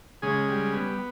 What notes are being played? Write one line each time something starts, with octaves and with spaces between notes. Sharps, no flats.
C#3 G#3 G#4
G3
B3